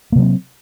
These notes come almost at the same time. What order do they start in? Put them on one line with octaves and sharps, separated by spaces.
A#3 C3 F#3 C4